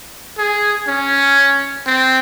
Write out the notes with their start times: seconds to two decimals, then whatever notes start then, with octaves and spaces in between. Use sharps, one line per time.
0.38 G#4
0.87 C#4
1.86 C4